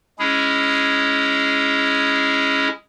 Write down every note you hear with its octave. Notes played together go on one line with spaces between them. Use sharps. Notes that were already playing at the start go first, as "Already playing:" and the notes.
G#3 C#4 E4 G#4